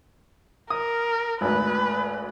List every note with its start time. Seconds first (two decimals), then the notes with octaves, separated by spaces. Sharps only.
0.70 A#4 D#6
1.41 G#1 D2 B4